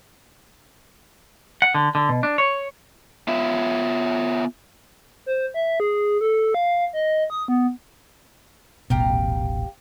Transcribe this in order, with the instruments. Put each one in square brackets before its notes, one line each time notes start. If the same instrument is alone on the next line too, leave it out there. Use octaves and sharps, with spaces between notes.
[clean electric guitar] F#5
D3
D3
B2
D4
C#5
[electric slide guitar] B3 F4 E5
[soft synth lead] C5
E5
G#4
A4
F5
D#5
D#6
B3
[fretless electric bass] D#1 A1 B2 [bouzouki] G4 F5 A#5